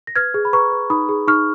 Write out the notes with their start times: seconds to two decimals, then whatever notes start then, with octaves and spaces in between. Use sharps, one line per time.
0.07 A#6
0.15 B4 F6 G#6
0.34 G#4
0.45 B5
0.53 B4 A#5 C#6
0.72 B4
0.90 D#4 B5 D#6
1.09 G#4
1.28 D#4 C#6 F6